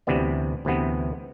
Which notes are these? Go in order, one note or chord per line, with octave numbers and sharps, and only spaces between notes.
D2 C3 E3 B3 D5
D2 C3 E3 B3